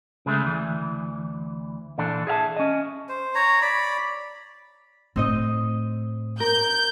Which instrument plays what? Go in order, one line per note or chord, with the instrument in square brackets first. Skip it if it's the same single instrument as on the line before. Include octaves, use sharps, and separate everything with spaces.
[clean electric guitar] C#3 G#3 A3
D2 E3
A#2 E3 D4 A4
G#4 E5 F5 A5
C#4 D#5
[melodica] C5
C#5 A#5
D5 B5
[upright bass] A2 [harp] C4 D#4 D#5
[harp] A#4 [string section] G6